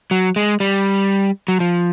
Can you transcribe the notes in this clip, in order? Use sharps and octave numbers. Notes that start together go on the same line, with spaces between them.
F#3
G#3
G3
F#3
F3